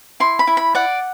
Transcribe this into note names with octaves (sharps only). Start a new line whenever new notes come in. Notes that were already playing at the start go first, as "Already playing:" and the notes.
E4 C6
B5
E4
B5
D5 F#5